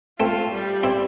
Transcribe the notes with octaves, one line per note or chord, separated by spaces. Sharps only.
A3 C4 F4
G3
C4 E4